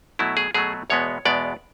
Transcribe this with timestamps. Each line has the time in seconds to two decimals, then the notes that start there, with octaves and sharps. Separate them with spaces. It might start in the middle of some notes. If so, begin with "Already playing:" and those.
0.19 B2 F#3 A3 E4
0.37 G#4
0.54 B2 F#3 A3 G#4
0.90 E2 B2 G#3 B3 C#5
1.25 E2 B2 G#3 B3 D5